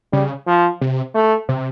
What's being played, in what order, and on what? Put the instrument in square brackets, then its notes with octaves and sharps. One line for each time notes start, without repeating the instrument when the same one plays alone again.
[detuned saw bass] C#3 [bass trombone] G3
[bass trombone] F3
[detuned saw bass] C3
[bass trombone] A3
[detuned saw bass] C3